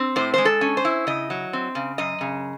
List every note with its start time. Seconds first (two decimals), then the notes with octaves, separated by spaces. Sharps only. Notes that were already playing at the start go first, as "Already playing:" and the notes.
Already playing: C4
0.16 A2 C5
0.34 G#3 C5
0.45 A4
0.61 C#4
0.77 C5
0.85 E4
1.07 C#3 D#5
1.30 F#3
1.53 C4
1.75 C#3
1.98 F#2 D#5
2.21 C#3